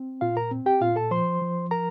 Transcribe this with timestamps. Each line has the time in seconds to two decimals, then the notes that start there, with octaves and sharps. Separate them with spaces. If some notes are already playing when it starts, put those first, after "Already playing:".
Already playing: C4
0.21 A#2 F4 F5
0.37 A#4 A#5
0.51 C4
0.66 G4 G5
0.81 A#2 F4 F5
0.96 A4 A5
1.11 F3 C5 C6
1.42 F3
1.71 A#4 A#5